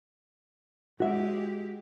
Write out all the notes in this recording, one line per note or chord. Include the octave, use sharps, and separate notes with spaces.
G#3 F#4 G4 E5